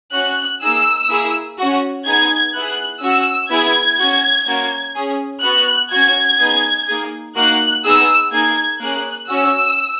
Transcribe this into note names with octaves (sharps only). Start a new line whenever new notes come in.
C#4 F#4 F#6
A#3 D#4 G#4 E6
A#3 E4 G#4
C#4 F#4
B3 D#4 G#4 G#6
B3 E4 G#4 F#6
C#4 F#4 E6
B3 E4 G#4 G#6
C#4 F#4
A#3 C#4 F#4
C#4 G#4
B3 F#4 F#6
C#4 F#4 G#6
B3 D#4 G#4
A#3 D#4 G#4
A#3 D#4 F#4 F#6
B3 D#4 G#4 E6
A#3 D#4 G#4 G#6
A#3 C#4 G#4 F#6
C#4 F#4 E6